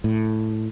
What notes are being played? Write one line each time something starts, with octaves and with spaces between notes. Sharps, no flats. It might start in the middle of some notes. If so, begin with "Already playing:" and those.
A2